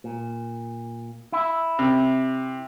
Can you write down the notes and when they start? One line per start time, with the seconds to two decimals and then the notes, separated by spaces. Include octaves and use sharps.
0.04 A#2
1.32 E4
1.79 C3